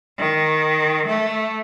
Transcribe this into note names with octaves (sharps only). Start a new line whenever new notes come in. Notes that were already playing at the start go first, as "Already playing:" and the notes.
D#3
A3